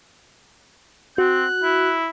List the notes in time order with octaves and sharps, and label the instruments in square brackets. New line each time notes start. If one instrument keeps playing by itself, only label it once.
[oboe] C4 [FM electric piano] F#4 [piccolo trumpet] F#6
[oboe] E4